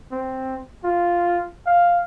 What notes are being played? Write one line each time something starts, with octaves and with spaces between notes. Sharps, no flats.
C4
F4
F5